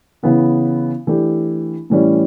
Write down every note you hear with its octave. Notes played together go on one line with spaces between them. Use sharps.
C#3 E3 B3 E4
E3 A3 D4 G4
A2 E3 G3 C#4